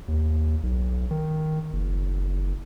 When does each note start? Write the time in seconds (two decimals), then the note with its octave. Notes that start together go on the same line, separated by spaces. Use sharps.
0.08 D#2
0.63 B1
1.11 D#3
1.73 F#1